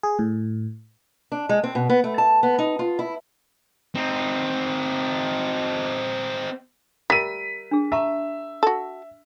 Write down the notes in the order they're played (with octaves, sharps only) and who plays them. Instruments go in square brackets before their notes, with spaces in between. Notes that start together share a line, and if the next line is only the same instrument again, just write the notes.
[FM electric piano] G#4
A2
[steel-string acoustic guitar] D4
G#3
C4
B2
B3
A3
A5
B3
D#4
F4
E4
[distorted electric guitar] C4 D#4
[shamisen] G3 [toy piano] A#4 E5 A#5 [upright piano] B6 D#7
[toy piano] D4 G#4
[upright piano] E5 [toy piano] A5 A#5 C#6
[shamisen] F#4 A4